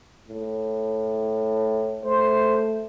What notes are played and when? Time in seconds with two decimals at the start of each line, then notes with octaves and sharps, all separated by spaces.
0.28 A2
2.05 A3 C5